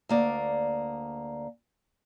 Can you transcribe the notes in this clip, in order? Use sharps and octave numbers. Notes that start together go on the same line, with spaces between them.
D2 A#3 D5